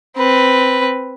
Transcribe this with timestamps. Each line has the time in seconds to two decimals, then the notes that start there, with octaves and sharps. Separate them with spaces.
0.17 C4 B4